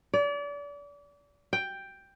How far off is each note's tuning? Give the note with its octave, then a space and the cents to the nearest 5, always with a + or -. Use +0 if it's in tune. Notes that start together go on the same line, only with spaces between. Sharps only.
D5 -35
G5 +5